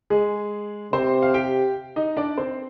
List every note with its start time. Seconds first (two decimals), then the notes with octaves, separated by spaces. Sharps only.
0.10 G#3 G#4
0.93 C3 C4 C5
1.23 F5
1.34 G4 G5
1.96 D#4 D#5
2.17 D4 D5
2.37 C4 C5